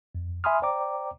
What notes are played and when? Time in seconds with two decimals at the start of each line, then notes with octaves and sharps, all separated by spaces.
0.15 F2
0.44 E5 G#5 B5 C6 D#6 F6
0.62 C5 D5 G5 A#5 D6